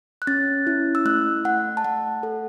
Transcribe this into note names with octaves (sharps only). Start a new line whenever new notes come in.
F#6
C#4 A6
E4
E6
A3 F#6
A3 F#5
A5
A3 F#5
A4